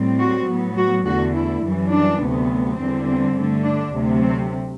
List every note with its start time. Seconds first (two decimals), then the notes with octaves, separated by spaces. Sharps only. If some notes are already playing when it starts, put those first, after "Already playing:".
Already playing: A2 G3 C4
0.19 F#4
0.49 A2 F#3 B3
0.77 F#4
1.05 E2 D3 A3 F#4
1.34 E4
1.63 F#2 E3 G3
1.91 D4
2.20 D2 C3 F#3 B3
2.78 E2 D3 G3 C4
3.07 C4
3.35 G2 D3 A3
3.64 D4
3.93 D2 C3 F#3 A3
4.22 C4